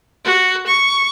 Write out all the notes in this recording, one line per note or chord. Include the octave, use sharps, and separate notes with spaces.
F#4
C#6